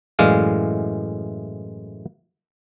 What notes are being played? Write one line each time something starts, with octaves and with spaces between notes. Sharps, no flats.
F#2 A2 E3 G#3 D5 F5